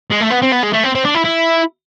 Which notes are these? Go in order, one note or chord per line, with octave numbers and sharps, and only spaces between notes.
G#3
A3
B3
C4
B3
G#3
A3
C4
C4
D4
E4
E4